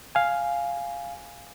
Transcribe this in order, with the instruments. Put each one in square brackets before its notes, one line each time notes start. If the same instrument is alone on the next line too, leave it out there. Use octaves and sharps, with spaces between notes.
[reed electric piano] F5 G#5